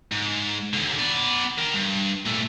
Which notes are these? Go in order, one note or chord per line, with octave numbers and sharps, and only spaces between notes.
G#2
D#2 D3
B3 D5
A#4 G5
G2
A#2 A3